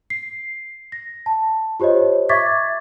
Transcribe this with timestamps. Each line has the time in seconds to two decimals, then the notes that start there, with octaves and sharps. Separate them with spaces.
0.10 C7
0.92 A#6
1.26 A5
1.80 F4 G4 C5 C#5 D#5
2.29 E5 C#6 D6 G#6 A6 B6